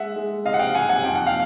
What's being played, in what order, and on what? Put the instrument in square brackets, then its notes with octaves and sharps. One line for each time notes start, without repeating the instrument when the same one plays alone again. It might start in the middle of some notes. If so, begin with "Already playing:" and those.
Already playing: [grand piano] G#3 E5 F#5
G#3
C3 D#5 F5
F#5
F5 G5
C3 F#5 G#5
F#5 G#5
F2 G5
F#5
F5 G5